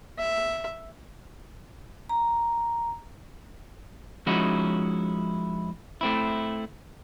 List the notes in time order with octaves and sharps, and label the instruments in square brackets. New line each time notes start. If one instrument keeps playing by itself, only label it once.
[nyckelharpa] E5
[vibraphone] A#5
[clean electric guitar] F3 G#3 C#4 D#4 E4 F#4
A3 C4 E4